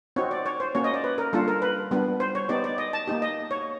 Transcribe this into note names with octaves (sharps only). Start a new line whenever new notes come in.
C4 D#4 F#4 C#5
D5
C#5
C5
A#3 C#4 F#4 C#5
D#5
D5
B4
A#4
G3 A#3 D4 F4 A4
A#4
B4
G3 B3 D4
C5
C#5
B3 D#4 G4 D5
D5
D#5
A5
A#3 D#4 G4
D#5
C#5